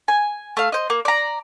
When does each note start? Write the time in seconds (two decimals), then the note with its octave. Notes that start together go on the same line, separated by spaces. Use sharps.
0.08 G#5
0.57 A3 F5
0.72 C5 D#5
0.90 A#3
1.05 D5 A#5